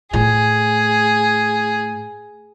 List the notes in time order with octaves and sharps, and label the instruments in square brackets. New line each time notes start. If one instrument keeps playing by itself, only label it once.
[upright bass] A2 [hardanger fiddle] G#4